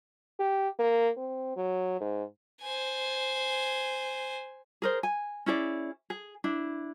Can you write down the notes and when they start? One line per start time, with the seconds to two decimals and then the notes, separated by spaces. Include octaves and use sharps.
0.39 G4
0.79 A#3
1.17 C4
1.56 F#3
2.00 G#2
2.62 C5 G#5
4.82 G#4 A#4 C5
5.03 G#5
5.46 C#4 E4 G#4 D5
6.10 G#4
6.44 D4 E4